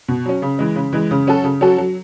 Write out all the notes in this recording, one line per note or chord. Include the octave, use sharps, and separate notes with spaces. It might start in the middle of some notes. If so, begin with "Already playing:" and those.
B2
F#3 C#4
C#3
E3 G#3
C#3
E3 G#3
C#3
F#3 C#4 F#4 A4
C#3
F#3 C#4 F#4 A4
F#3